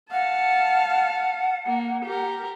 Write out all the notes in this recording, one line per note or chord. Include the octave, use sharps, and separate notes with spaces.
F5 F#5 A5
A#3
G4 A#4